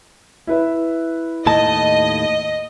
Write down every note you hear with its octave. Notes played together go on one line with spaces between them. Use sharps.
E4 B4 E5
D#2 A2 D#5 A5